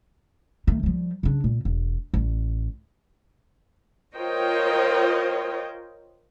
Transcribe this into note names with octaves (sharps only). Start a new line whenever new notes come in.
D#3 A3
F3 G3
C#3 D4
A#2
E1
A1
F4 A#4 C5 C#5 D#5 G5